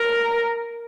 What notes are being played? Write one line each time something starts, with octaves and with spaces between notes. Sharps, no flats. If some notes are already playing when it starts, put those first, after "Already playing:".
Already playing: A#4